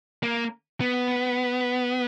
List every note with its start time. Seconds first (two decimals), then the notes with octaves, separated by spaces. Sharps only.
0.23 A#3
0.81 B3